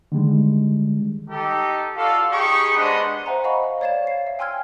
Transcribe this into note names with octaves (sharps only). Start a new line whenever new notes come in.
D3 D#3 G3 G#3
D#4 G4 A4
F4 F#4 A4 D5 F5
D#4 G4 G#4 B5 C#6
G#3 B3 D4 C5 D#5 F#5
C5 E5 F#5 G#5 A#5
D#5 F5 A#5 B5 C#6
C#5 D5 F5 G#6 E7
C7
E5
G5 G#5 C6 E6 F6 G#6